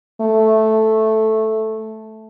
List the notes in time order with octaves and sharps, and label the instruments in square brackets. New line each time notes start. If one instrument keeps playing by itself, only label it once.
[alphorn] A3